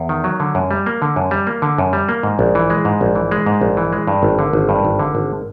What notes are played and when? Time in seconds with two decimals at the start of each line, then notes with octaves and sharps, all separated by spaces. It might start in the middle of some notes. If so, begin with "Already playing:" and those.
Already playing: E2
0.09 D#3
0.24 F#3
0.40 D3
0.55 F#2
0.71 G3
0.86 A#3
1.02 D3
1.16 F#2
1.31 G3
1.47 A#3
1.62 D3
1.78 F#2
1.93 G3
2.09 A#3
2.23 G#2
2.39 A#1
2.55 E3
2.70 G#3
2.85 G#2
3.01 A#1
3.15 E3
3.31 G#3
3.46 G#2
3.61 A#1
3.77 E3
3.92 G#3
4.07 G2
4.23 G#1
4.39 D3
4.53 G#1
4.69 G2
4.85 G#1
4.99 D3
5.15 G#1